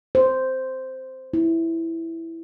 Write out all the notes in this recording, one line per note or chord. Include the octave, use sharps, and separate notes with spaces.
C5
E4